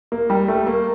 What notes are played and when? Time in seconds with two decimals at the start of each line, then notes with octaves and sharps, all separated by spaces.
0.12 A#3
0.30 G3
0.48 A3
0.67 A#3